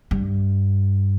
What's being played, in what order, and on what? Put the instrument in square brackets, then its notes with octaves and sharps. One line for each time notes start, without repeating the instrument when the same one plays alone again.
[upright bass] G2